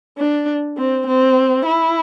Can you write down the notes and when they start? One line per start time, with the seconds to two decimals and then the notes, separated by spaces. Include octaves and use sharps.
0.18 D4
0.77 C4
1.07 C4
1.66 E4